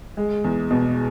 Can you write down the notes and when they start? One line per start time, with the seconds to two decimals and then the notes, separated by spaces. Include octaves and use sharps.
0.17 G#3
0.44 E2
0.71 B2